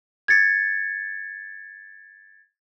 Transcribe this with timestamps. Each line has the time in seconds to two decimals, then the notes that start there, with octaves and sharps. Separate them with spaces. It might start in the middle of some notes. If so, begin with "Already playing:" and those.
0.28 G#6 A6 C#7